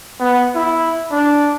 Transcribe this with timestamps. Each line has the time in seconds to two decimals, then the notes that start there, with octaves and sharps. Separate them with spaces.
0.20 B3
0.55 E4
1.12 D4